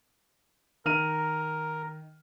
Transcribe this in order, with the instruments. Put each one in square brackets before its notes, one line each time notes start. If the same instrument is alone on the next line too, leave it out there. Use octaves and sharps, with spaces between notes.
[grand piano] D#3 F6 D#7 [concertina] A#4